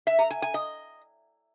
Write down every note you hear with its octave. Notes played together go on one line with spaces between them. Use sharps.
E5
A#5
G#5
G#5
D#5